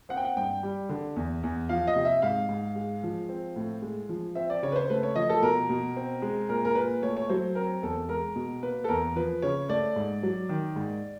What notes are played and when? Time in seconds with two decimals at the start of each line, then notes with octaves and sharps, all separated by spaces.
0.09 C4 F#5
0.17 G5
0.25 F#5
0.37 G2 G5
0.63 G3
0.89 D3
1.16 E2
1.43 E2
1.69 F3 F5
1.87 D#5
1.96 C3
2.05 E5
2.22 G#2 F5
2.49 G#2
2.75 G#3
3.03 F3
3.29 C4
3.56 A2
3.82 G#3
4.09 F3
4.35 C4 E5
4.50 D5
4.63 C#3 C#5
4.72 B4
4.76 C5
4.90 A3 B4
5.03 C#5
5.16 F3 D#5
5.29 A4
5.42 B2 A#4
5.69 B2
5.96 C4
6.22 G#3
6.49 A#2 A#4
6.65 A#4
6.75 A#2 B4
7.02 A3 C#5
7.17 C#5
7.29 F#3 C5
7.55 C4 A#4
7.83 E2 A4
8.09 G#3 A#4
8.36 B2
8.62 A#3 B4
8.84 A4
8.88 E2 A#4
9.16 F3 B4
9.42 C#3 C#5
9.69 A3 D5
9.96 G#2
10.23 F#3
10.49 D#3
10.76 G#2